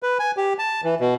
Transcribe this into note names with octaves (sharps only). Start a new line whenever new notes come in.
B4
G#5
G4
A5
E3
B2